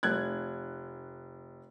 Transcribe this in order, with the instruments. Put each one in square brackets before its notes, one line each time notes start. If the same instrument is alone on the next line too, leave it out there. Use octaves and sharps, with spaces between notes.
[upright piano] F1 F#6 G#6